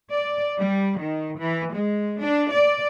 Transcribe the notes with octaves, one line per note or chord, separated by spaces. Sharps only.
D5
G3
D#3
E3
G#3
D4
D5